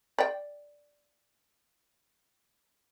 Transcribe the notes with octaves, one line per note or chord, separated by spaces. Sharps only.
D5 G5